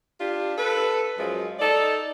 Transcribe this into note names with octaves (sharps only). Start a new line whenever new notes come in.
D4 F4 G4
A4 B4
F#2 F3 G#3
D#4 A4 D5